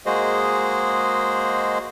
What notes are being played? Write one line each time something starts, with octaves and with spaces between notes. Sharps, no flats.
G#3 A#3 F#4 G#4 C5 D#5